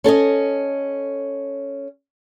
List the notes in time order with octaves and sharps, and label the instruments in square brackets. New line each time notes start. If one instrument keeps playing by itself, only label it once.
[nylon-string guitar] C#4 A4 C#5 D#5